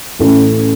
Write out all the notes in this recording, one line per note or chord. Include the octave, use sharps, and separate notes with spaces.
A1 A2 A3 C#4